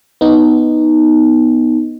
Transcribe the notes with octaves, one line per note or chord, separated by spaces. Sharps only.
B3 D#4